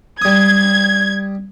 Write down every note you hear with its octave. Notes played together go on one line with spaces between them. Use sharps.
G3 D#6 G#6